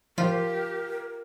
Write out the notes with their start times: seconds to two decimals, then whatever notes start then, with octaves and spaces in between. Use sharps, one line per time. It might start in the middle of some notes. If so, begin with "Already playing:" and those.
0.18 F3 F4 G4 A#4